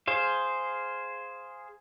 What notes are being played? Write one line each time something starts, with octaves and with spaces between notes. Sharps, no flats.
G#4 C5 F5